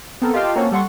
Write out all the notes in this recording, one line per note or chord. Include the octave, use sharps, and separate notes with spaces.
B3 C4 A4 A#4
F4 G4 D#5 F5 G5 A5
A#3 C4 C#4 F#4 A4 C#5
G3 A4 F#5 C6 C#6